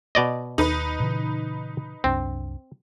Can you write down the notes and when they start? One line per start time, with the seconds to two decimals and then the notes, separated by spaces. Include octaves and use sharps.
0.15 B2 D5 D#5
0.58 D#2 D#4 B4
1.00 A#2 C#3 E3
2.04 C2 F#2 C4 D4